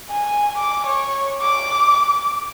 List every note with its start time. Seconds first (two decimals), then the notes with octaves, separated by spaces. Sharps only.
0.11 G#5
0.58 D6
0.87 C#5
1.42 D6